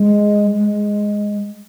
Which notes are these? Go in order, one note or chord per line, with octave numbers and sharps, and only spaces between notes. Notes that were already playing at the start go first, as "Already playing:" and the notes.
Already playing: G#3
G#3